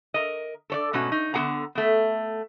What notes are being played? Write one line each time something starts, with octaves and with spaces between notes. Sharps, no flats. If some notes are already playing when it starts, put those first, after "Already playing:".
A#4 D#5
A4 C#5 D5
G#2 B2 A3 C#4 F#4
D#4
D3 B3 G#4 F#5 A#5
A3 B3